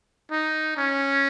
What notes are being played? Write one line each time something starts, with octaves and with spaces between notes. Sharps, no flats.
D#4
C#4